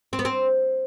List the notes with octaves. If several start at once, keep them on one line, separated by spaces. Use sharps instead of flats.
C4
B3
C4